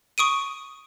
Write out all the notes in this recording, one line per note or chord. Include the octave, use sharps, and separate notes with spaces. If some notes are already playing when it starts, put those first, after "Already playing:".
C#6 D#6 D7 D#7